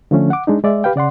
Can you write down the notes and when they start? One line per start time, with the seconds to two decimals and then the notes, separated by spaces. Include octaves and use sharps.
0.11 D3 F3 A3 C#4
0.30 F#5 D6
0.47 G#3 D4 D#4
0.63 G#3 D5 E5
0.84 G4 B4 F5 G5
0.96 C#3 D5 F#5 C6